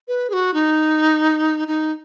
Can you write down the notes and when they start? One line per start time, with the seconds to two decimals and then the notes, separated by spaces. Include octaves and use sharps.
0.08 B4
0.30 G#4
0.33 F#4
0.54 D#4
1.68 D#4